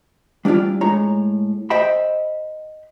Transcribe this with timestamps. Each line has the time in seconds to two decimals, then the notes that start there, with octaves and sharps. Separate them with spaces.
0.45 G3 D4 E4 F4 D5
0.81 A2 G#3 C#5 A#5
1.70 C5 D#5 E5 G5 B5